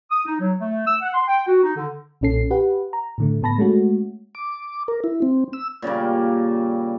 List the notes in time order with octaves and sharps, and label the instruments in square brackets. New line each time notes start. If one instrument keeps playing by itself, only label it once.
[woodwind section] D#6
D#4
F#3
A3
E6
F#5
C6
G5
F#4
D#4
D3
[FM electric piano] B1 A#2 C#4 A4 C7
G4 B4 F#5
A#5
A2 D3 A3
A2 B3 A5 B5 A#6
G#3 A3 C#4 F#4
[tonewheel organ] D6
A#4
E4
C4
E6
[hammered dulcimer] A#2 C#3 G3 A#3